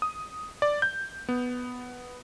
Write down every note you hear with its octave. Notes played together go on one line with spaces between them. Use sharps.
D#6
D5
G6
B3